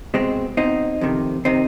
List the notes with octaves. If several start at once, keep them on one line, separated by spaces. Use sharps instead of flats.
B2 G#3 C4
B2 C4 D#4
F2 C3 D#3
C3 D#3 C4 D#4